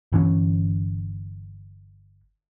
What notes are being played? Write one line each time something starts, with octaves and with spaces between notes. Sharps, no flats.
G1 E3 C#4